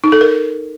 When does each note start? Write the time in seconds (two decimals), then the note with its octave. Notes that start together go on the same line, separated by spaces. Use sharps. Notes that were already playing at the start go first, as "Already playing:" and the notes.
0.04 D#4
0.12 A4
0.21 A#4